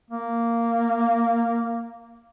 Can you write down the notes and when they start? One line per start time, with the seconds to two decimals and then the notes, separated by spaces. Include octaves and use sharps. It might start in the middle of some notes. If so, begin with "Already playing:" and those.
0.11 A#3